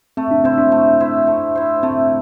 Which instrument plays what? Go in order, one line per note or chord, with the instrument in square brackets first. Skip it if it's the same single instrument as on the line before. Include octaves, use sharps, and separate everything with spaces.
[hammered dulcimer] A3 [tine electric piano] C4
[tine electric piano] D4
[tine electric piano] C4 [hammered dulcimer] E4 C5
[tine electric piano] D4
[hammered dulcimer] A3
E4 C5
A3
E4 C5
[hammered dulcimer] A3 [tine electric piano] C4